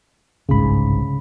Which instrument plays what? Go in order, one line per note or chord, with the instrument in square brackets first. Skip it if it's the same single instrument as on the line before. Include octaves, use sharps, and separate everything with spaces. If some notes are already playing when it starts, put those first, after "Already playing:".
[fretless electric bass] G1 C2 G#2 [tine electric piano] C#3 B5